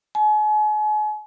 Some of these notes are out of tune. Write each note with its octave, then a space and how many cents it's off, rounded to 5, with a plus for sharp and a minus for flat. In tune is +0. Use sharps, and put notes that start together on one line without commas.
G#5 +40